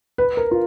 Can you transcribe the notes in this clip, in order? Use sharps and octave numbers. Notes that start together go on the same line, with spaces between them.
B4
A#4
F4